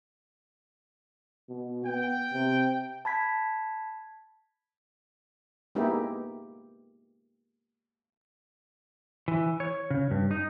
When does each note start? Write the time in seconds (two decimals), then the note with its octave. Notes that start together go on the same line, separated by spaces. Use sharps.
1.49 B2
1.85 B3 G5
2.33 C3
3.05 A5 B5 G#6 B6
5.75 G#3 A#3 B3 D#4 E4 G4
9.28 E3
9.60 C#5
9.90 C#3
10.11 G2
10.31 D#4